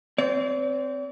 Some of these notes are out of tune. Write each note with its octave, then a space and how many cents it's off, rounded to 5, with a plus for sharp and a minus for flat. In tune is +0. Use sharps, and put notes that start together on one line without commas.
C4 -10 D5 -45